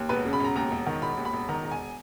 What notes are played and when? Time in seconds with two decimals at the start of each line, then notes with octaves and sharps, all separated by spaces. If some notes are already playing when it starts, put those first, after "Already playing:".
Already playing: D#2
0.09 E1 B4
0.25 C#3
0.33 B5
0.40 E1 A#5
0.56 D#2 A#5
0.72 E1
0.87 D#3
1.02 E1 B5
1.18 D#2
1.25 B5
1.33 E1
1.48 D#3 A#5
1.63 E1 A#5
1.71 G#5